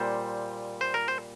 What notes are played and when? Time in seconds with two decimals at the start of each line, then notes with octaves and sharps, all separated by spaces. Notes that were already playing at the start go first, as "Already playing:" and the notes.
Already playing: A#2 G3 C5
0.81 C5
0.94 A#4
1.08 C5